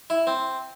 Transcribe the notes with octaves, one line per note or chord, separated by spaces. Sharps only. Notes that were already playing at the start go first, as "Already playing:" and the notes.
E4
C4